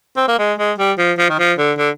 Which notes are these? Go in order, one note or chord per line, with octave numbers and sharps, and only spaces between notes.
C4
A#3
G#3
G#3
G3
F3
F3
D#3
F3
D3
D3